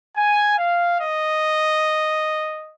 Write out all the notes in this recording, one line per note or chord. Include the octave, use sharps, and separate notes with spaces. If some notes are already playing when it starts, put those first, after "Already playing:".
G#5
F5
D#5